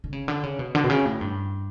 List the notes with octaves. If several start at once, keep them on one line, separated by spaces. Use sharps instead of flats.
D3
C#3
D3
C#3
B2
D3
B2
C#3
A2
G2